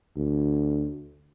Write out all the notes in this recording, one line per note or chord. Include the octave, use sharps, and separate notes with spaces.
D2